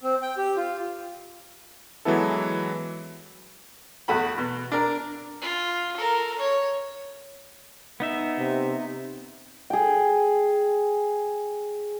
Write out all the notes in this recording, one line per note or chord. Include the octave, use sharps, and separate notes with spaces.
C4
G5
G4
F4
E3 F#3 G#3 B3 E4 A4
E2 A3 F#4 B5
B2
D4 A#4
F4
A4 A#4
C#5
B3 D#4 E5
C3
G#4 G5